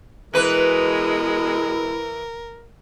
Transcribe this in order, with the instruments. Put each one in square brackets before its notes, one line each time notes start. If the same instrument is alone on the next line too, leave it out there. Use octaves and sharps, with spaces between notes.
[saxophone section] B2 G#3 [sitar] E3 B4 [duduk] E4 [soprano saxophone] A#4